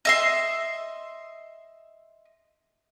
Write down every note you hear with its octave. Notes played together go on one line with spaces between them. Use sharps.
D#5 E5 C6